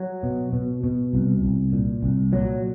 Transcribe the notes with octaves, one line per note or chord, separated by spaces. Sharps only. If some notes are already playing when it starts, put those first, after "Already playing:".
Already playing: F#3
B2
B2
B2
C2
C2
A#2
C2
A#2 F#3